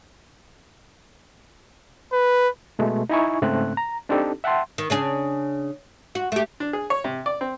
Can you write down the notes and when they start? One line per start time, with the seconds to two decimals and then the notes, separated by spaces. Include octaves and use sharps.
2.12 B4
2.79 B2 G#3 A3
3.09 D#4 E4 G#5 C#6
3.42 G#2 C#3 A3 C4 F#6
3.77 A#5
4.09 C4 D4 D#4 G4 A4
4.44 E5 F#5 G5 A5 C6
4.78 D#3
4.90 C#3 D4 G#4
6.15 F#4
6.32 A3 G4
6.60 D4
6.73 G#4
6.90 C#5
7.04 C3
7.26 D5
7.41 C4